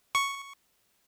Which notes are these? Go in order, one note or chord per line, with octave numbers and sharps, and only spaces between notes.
C#6